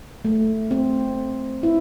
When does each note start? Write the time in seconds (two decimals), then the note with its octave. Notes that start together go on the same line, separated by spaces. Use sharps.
0.25 A3
0.71 C4
1.63 E4